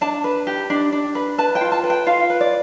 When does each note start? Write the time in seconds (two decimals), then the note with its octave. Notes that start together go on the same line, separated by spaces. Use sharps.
0.01 D4 A5
0.24 B4
0.47 G4
0.70 D4
0.92 D4
1.15 B4
1.38 B4 A5
1.55 G5
1.61 F4
1.72 A5
1.84 B4
1.90 G5
2.06 F4 F5
2.30 B4
2.41 D5